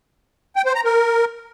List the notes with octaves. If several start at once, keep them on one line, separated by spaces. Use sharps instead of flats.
G5
C5
A#5
A#4